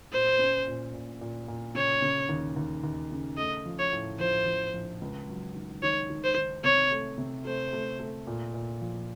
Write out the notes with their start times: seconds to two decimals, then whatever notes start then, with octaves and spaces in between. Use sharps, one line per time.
0.12 A#2 C5
0.39 C#4
0.67 A#2
0.93 A#2
1.21 A#2
1.48 A#2
1.75 C#3 C#5
2.02 C#3
2.29 D#2
2.56 D#2
2.84 D#2
3.12 C#3
3.38 A3 D#5
3.65 F3
3.79 C#5
3.93 A2
4.20 F3 C5
4.46 F3
4.74 A#1
5.01 C#2
5.28 F#3
5.55 D#3
5.83 D#3 C#5
6.10 D#3
6.24 C5
6.37 D#3
6.64 C3 C#5
6.91 A3
7.18 C3
7.45 A3 C5
7.73 A3
8.00 A3
8.27 A#2
8.54 A#2
8.81 F3